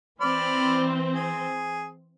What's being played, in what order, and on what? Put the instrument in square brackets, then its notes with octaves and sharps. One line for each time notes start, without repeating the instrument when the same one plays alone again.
[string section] E3 C4 [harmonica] D5 B5 F6
[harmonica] G#4